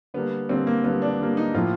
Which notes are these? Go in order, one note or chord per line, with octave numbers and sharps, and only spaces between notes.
D3 G3 A#3 B3
D3 G3 A#3 C4
A#3
D3 G3 A#3 B3
D4
D3 G3 A#3
D#4
A2 F3 A#3 F4